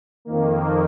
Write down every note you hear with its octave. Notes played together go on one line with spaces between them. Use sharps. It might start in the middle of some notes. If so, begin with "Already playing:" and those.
F2 D#3 A#3